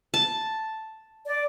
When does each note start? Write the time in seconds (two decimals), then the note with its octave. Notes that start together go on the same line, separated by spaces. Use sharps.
0.14 A5
1.25 D5